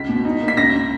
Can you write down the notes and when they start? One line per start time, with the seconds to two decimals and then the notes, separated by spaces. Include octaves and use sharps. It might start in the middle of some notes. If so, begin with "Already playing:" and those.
Already playing: C#2 B6
0.09 B2
0.25 D#4
0.41 A#3
0.48 B6
0.57 C#2 A#6